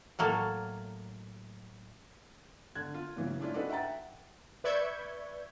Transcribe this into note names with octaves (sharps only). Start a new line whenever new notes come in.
A2 F#3 A#3 A4
D3 F#6 G#6
F4
A#2 C#3 E3 F#3
G#3 C#4 D4 E4 F4
D4 D#4 F#4 A4 B4
E5 F#5 G5 A#5 A6
B4 D5 E5 C#6 G6 G#6